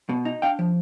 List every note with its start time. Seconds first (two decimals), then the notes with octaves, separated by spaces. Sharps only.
0.09 B2
0.25 D#4
0.42 D4 F5 G5
0.59 F3